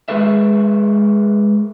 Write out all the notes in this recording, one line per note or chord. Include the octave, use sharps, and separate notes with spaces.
G#3 G#4 A#4 B4 E5